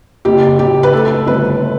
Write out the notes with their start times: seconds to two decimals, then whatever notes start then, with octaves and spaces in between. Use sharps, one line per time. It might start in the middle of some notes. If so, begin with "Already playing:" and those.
0.25 F#1 G4
0.59 F#1 G4
0.83 B4
0.93 A3 A4
1.27 G1 B4